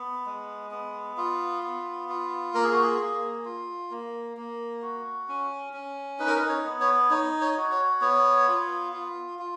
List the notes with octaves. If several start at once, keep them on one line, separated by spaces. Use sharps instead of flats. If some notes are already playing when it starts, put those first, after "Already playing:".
Already playing: B3
G#3
B3
F4
B3
F4
A#3 A#4
G#4
F#4
G#4
A#3
F4
A#3
A#3
F#4
C#4
C#4
D#4 B4
A#4
B4
C#5
B3
C#5
D#4 C#5
C#5
F#4
C#5
B3 C#5
F4
F4
F4